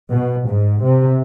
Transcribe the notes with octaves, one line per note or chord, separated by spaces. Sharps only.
B2
G#2
C3